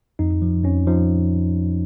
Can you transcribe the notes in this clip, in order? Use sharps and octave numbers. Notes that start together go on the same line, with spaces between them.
F2 D#4
F3
F2 C#4
F3 D#4